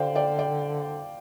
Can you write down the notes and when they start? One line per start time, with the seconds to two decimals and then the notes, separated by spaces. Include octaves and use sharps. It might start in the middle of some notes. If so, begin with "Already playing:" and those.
Already playing: D3 C5 D5 F5 G5
0.15 D5 G5
0.39 D5 G5